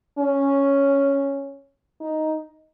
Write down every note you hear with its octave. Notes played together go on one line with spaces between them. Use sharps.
C#4
D#4